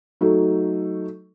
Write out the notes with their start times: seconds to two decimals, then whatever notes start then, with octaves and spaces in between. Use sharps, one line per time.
0.21 F#3 A3 D#4